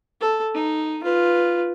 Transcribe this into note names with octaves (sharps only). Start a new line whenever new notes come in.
A4
D#4
F4 B4